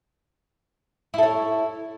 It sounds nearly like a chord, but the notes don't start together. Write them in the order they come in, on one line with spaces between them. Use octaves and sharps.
E4 A4 C#5